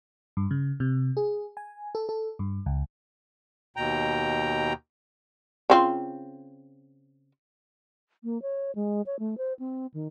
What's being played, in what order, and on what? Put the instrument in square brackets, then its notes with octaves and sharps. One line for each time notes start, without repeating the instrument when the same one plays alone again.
[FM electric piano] G2
C#3
C3
G#4
G#5
A4
A4
G2
C#2
[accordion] D#2 B2 G5 A#5
[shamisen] C#3 C4 F4
[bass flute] A#3
C#5
G#3
C#5
A3
C5
C4
D#3